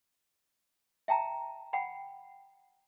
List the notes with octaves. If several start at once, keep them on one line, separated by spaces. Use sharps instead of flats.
E5 G5 A5 A#5
F#5 G5 B5